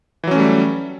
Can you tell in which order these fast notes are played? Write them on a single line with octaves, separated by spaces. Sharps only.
E3 F#3 C#4 A3 G3